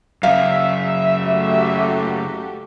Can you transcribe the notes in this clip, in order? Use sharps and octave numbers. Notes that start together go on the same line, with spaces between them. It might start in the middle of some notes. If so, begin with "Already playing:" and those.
F#2 C#3 E5 F5
A3 F#4 G4